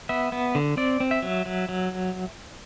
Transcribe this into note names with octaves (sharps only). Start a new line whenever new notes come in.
B3 E5
B3
D3
C4 D5
C4
E5
F#3
F#3
F#3